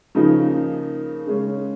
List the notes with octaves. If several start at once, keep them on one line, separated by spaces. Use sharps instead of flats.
C#3 F3 A#3 D#4
C#3 G#3 C#4